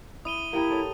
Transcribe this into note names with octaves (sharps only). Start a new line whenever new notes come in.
E4 D#6 D#7 G7
A#3 E4 G4 A#5
A4 C#5